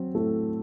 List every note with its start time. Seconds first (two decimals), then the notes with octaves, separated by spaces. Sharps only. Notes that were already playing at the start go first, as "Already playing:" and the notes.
Already playing: F#3 C4
0.15 A2 A3 A4